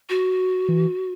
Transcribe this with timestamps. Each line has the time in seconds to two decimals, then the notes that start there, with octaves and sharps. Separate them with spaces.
0.09 F#4
0.68 E3